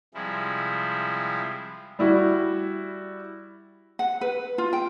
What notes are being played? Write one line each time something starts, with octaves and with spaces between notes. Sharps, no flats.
C3 F3 G3 G#3 E4
G3 E4 F#4
F#5
B4
F4
G5